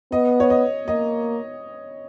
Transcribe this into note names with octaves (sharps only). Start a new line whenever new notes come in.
B3 D#5
C#5
D#5
A#3 D#5